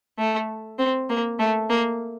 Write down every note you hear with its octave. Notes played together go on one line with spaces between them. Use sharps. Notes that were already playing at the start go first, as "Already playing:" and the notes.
A3
C4
A#3
A3
A#3